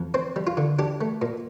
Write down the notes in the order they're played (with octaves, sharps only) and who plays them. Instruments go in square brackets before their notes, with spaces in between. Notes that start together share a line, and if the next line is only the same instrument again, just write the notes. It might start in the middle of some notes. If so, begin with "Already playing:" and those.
Already playing: [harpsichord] F2
C4 C5
G3
F4
D3
D4 G4
A3
A#2